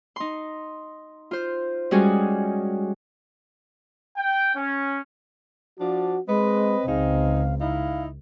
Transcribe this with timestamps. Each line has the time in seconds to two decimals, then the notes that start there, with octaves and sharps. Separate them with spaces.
0.16 D#4 C6
1.31 F4 C5
1.91 G3 G#3 C#4 F#4 G#4
4.17 G5
4.54 C#4
5.80 F3 D4 F#4
6.28 G#3 C4 B4 D#5
6.87 C#2 G#3 D#4 F5
7.60 D#4 E4 F5